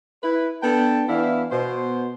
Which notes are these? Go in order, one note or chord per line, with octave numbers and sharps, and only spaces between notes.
E4 B4
B3 D4 A4 G5 A5
E3 B3 D4 E4 E5 F5
B2 C5